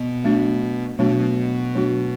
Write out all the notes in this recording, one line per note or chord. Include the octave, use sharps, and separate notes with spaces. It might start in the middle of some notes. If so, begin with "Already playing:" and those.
Already playing: B2
F#3 A3 D4 F#4
B2 F#3 A3 D4 F#4
F#3 A3 D4 F#4